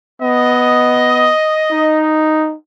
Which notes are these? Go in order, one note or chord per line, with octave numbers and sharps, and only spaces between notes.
B3 D#5
D#4